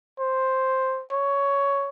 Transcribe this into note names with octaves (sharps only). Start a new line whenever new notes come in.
C5
C#5